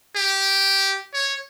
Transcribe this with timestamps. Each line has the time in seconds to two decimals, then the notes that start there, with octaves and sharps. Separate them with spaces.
0.16 G4
1.13 C#5